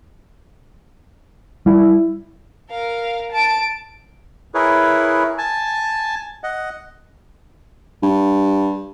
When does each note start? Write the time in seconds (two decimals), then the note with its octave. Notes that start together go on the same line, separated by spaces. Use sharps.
1.66 G3 E4
2.70 A#4 F5
3.32 A5 D7
4.55 E4 G#4 A#4 B4 C#5
5.38 G#5 A5
6.44 D#5 F#5
8.03 G2